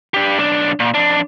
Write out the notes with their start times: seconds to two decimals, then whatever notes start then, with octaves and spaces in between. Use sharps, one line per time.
0.14 D4 G4
0.39 B1 D4
0.80 A#2
0.94 F2 D4